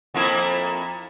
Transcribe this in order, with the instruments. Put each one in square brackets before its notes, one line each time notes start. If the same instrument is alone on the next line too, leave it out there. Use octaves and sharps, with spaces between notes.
[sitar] F2 A#3 E4